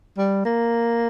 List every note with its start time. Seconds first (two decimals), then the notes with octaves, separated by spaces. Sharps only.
0.18 G3
0.45 A#3